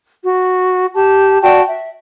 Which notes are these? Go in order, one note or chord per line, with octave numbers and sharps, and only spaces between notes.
F#4
G4 A5
F#4 D5 G5 A5
E5